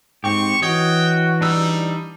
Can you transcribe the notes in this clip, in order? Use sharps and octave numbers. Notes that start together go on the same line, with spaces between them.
G#2 C4 G4 C#6
E3 F#4 C#5 D#5 G5
G3 D4 D#4 E6